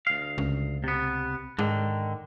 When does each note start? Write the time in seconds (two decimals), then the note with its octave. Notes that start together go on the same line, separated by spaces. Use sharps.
0.07 D2 F5
0.38 C#2
0.84 C3 B3
1.59 G#2 D3 D#3